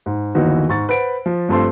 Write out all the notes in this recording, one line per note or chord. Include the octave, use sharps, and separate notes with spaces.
G#2
G1 D#2 E3 D#4 F#4 B4
G#2 C#6 A6
B4 C5 F#5 D7
F3
G2 F3 A3 C4 A5 C6